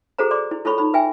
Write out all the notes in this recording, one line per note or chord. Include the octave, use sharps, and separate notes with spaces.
F#4 G#4 A4 C5 A#5
G#4 D5 C6 D6
E4
E4 F4 A4 C#5 B5 C#6
D#4 B5
B4 E5 G5 G#5